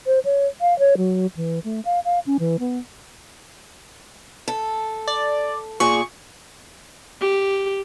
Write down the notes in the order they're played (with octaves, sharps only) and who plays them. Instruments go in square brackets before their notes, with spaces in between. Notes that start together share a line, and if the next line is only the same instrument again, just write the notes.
[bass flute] C5
C#5
F5
C#5
F#3
E3
A3
F5
F5
C#4
E3
B3
[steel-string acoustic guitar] A4
[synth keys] D5
[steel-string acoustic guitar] A#2 G#4 [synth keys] C#6
[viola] G4